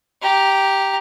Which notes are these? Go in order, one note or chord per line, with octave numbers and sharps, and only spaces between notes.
G4 A#5